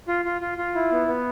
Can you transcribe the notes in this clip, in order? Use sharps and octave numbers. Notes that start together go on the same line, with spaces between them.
F4
F4
F4
F4
E4
B3
B3